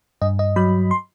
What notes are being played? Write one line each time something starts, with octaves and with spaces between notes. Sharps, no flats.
G2 D#5
D#5
F#3 B5
C6